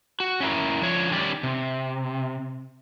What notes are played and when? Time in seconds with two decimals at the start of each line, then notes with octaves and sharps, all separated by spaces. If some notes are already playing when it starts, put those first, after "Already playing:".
0.20 F#4
0.40 C#4 E4 A#4
0.81 F3 D4 C#5
1.11 D#3 C#4 G4 D5
1.43 C3